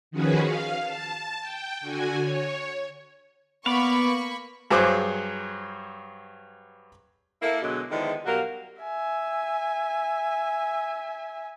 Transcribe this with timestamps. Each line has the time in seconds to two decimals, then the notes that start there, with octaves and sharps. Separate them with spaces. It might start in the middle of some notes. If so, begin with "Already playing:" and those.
0.11 D#3 F3 C#4 F#4 G#4 B4
0.42 F5
0.82 A5
1.41 G5
1.81 D3 F#4 G#5
2.19 C#5
3.66 A#3 B3 D5 F5 B5 C#6
4.71 G2 F#3 G#4 C5 D6 F#6
7.42 A#3 E4 A4
7.62 B2 D3 F#3 G#3
7.91 D3 D#3 F3 G#3 B3 E4
8.25 B2 F#3 G3 F#4 A#4 F5
8.82 E5 G#5